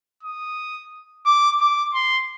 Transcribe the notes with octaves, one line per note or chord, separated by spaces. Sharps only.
D#6
D6
D6
C6